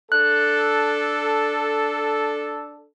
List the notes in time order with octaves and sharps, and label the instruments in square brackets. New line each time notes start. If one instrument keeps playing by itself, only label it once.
[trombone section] D4 A4 [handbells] F#6